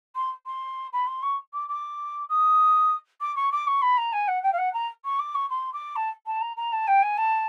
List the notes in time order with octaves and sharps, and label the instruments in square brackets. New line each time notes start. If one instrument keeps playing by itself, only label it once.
[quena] C6
C6
B5
C6
C#6
D6
D6
D#6
D6
C#6
D6
C#6
B5
A#5
G#5
F#5
G5
F5
F#5
A#5
C#6
D6
C#6
C6
D6
A5
A5
A#5
A#5
A5
G5
G#5
A5